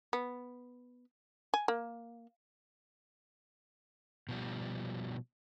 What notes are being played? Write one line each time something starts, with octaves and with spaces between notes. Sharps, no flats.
B3
G#5
A#3
B2 F3 G3